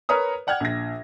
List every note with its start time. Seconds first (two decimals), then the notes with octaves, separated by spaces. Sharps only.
0.09 A#4 B4 C#5 A#5 D#6
0.47 D5 F#5 G5 F6 G#6
0.60 A#1 A#6